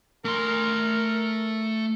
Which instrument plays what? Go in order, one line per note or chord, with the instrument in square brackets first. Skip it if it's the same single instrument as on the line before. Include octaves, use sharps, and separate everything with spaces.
[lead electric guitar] A3 C6 [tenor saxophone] A#4